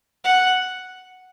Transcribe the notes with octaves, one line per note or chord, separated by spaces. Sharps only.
F#5